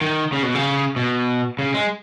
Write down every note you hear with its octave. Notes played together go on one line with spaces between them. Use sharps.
D#3
C#3
B2
C#3
B2
C#3
G#3